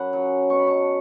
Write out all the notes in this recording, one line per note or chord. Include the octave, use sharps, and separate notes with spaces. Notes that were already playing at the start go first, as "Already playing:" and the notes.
Already playing: F#2 F#5 A5 B5
C#3 F#3
B2 C#6
B5
A5 C#6